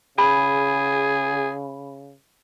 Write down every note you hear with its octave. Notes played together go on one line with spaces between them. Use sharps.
C#3 G#4 B5